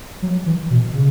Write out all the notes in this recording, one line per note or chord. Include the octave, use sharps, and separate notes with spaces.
F#3
E3
B2
C#3